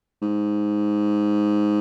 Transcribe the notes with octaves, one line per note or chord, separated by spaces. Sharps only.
G#2